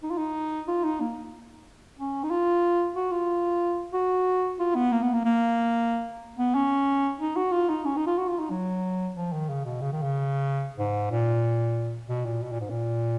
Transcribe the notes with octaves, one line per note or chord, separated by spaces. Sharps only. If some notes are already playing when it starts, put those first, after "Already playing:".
D#4
F4
D#4
F4
D#4
A#3
C#4
D#4
F4
F#4
F4
F#4
F4
B3
A#3
B3
A#3
A#3
B3
C#4
D#4
F#4
F4
D#4
C#4
D#4
F4
F#4
F4
D#4
F#3
F3
D#3
C#3
B2
C#3
D#3
C#3
G#2
A#2
B2
A#2
B2
A#2
G#2
A#2